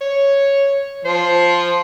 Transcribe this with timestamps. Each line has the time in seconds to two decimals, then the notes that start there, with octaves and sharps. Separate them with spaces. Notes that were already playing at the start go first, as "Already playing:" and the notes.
0.01 C#5
1.05 F3 C5